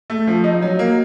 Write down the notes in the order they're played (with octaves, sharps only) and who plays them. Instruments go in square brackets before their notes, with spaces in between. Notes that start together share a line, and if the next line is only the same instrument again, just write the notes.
[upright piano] A3
F3
D#4
F#3
A#3